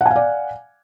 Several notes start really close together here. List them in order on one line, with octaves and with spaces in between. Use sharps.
F#5 G#5 F5 D5